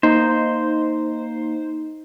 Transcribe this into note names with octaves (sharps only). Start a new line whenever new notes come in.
A#3 D#4 C5 A#5